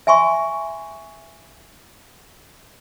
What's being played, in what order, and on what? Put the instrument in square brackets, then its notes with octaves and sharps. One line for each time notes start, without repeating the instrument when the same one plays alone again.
[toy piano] E5 G#5 C6 C#6